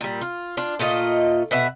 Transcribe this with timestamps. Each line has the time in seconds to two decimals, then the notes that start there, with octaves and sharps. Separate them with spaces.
0.01 A#2 G3
0.22 F4
0.57 D4 F4
0.79 A#2 A3 F4 D#5
1.51 B2 B4 E5 F#5